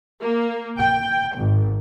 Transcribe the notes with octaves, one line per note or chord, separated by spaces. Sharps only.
A#3
G5
G#1